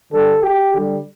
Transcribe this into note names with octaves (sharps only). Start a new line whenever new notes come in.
D3 G3 A4
G4
D3 G3